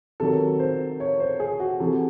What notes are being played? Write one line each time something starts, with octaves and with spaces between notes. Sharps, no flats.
C3 D#3 F#3 A4
C5
C#5
C5
G#4
F#4
C3 E3 C4 A4